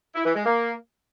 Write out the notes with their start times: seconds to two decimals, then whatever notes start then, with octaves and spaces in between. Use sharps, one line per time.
0.15 E4
0.25 E3
0.35 G#3
0.45 A#3